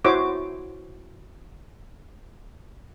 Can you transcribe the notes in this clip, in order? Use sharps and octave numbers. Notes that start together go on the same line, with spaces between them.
E4 F#4 C5 C#5 D6